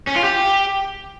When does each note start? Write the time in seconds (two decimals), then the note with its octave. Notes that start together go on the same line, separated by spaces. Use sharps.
0.07 C#4
0.16 F4
0.24 G4